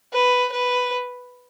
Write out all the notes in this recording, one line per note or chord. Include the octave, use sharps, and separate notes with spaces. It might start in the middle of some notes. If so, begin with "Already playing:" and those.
B4
B4